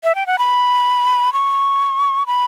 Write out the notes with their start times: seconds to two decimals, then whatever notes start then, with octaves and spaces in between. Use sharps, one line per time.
0.04 E5
0.15 G5
0.27 F#5
0.39 B5
1.33 C#6
2.27 B5